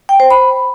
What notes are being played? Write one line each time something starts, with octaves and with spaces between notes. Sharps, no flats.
G5
C5
B5